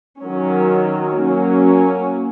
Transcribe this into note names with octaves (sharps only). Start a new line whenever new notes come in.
D#3 F#3 C#4
F#3 A#3 C#4